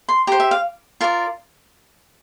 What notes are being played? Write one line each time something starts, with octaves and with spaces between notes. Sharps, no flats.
C6
G4 C5 A#5
E5
F5
F4 A#4 D5